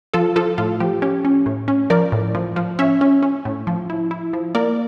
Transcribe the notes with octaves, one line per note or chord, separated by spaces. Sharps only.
F3 F4 A4
F3 F4 A4
A2 F4
F3 G4
C#4 G4
C#4
A2
C#4
F3 A#4 D5
A2
F3
F3
C#4 C#5 E5
C#4
C#4
A2
F3
E4
E4
F3
A#3 A#4 D5